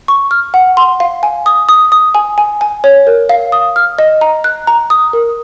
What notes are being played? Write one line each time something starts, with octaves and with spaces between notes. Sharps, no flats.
C#6
F6
F#5
C6
F5
G#5
D#6
D#6
D#6
G#5
G#5
G#5
C#5
A#4
F5
D#6
F6
D#5
A#5
F#6
A#5
D#6
A#4